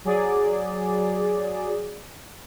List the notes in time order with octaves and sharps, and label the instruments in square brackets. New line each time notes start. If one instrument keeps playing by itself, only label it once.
[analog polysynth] F#3 G#4 D5